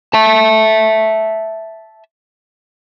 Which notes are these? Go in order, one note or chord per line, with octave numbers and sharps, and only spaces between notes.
E5 A5